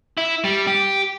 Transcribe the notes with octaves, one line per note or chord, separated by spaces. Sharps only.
E4
G3
G4